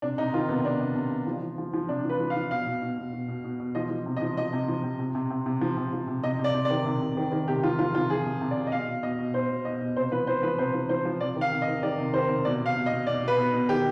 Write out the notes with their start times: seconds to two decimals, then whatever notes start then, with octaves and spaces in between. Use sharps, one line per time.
0.02 C3 D4
0.18 C3 D#4
0.34 D#3 F4
0.49 C3 B3
0.64 C3 D4
0.80 C3
0.95 C3
1.11 C3
1.27 F3
1.42 F3
1.58 F3
1.74 F3
1.88 C3 D4
2.04 F3
2.09 B4
2.20 F3
2.30 F5
2.36 F3
2.51 B2 F5
2.66 B2
2.82 B2
2.98 B2
3.13 B2
3.28 B2
3.44 B2
3.60 B2
3.75 F3 D#5
3.90 F3
4.06 C3
4.17 D#5
4.21 F3
4.37 F3 D#5
4.53 C3
4.68 F3
4.84 C3
4.99 C3
5.15 C3
5.30 C3
5.46 C3
5.61 F3
5.77 C3
5.93 F3
6.08 C3
6.23 C3 D#5
6.39 C3
6.44 D5
6.54 C3
6.65 D5
6.70 D#3
6.86 C3
7.01 C3
7.17 D#3
7.32 D#3
7.48 C3 G4
7.63 F3 F4
7.79 F3 F4
7.94 C3 F4
8.10 F3 G#4
8.25 C3
8.41 C3
8.51 D5
8.57 C3
8.67 D#5
8.72 B2 F5
8.88 B2
9.03 B2 D#5
9.18 B2
9.34 B2 C5
9.50 B2
9.65 B2 D#5
9.81 B2
9.96 C3 C5
10.12 F3 B4
10.27 F3 C5
10.43 F3 B4
10.58 C3 C5
10.74 F3
10.89 F3 C5
11.05 F3
11.21 C3 D5
11.36 D#3
11.41 F5
11.52 C3
11.62 D#5
11.67 D#3
11.83 D#3 D5
11.98 C3
12.14 D#3 C5
12.29 C3
12.45 B2 D5
12.60 B2
12.66 F5
12.76 B2
12.86 D#5
12.91 B2
13.07 B2 D5
13.23 B2
13.28 B4
13.38 B2
13.53 B2
13.69 D#3 G4